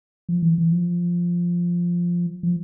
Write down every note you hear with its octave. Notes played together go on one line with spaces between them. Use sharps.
F3
E3
E3
F3
F3